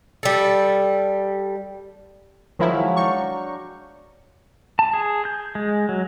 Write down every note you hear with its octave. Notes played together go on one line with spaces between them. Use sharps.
G3 A4
D#3 F3 F#3 G#3 E4 F5
D4 G5 A#5 C#6
A5
G#4
G6
G#3
F#3